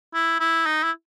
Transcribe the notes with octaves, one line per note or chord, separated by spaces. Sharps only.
E4
E4
D#4
E4